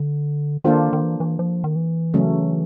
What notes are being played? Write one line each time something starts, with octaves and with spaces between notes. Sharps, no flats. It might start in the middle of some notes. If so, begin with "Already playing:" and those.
Already playing: D3
D#3 A#3 D4 F4 A4 C5
D#3
E3
E3
F3
D#3
E3
C#3 F#3 A3 C#4